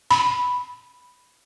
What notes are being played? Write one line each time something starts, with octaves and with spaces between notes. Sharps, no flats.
B5